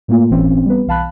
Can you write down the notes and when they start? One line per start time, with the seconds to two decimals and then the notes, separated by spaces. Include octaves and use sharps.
0.08 A2 A3 A#3 F4
0.30 G1 A2 E3 C4 C#4
0.66 G3 B3 B4
0.87 B1 E3 F5 A5 B5 F#6